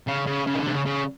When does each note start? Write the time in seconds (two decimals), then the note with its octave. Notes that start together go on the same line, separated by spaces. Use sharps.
0.07 C#3
0.27 C#3
0.47 C#3
0.55 D#3
0.60 D3
0.67 C3
0.73 C#3
0.86 C#3